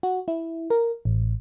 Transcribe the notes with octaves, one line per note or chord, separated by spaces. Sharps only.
F#4
E4
A#4
A1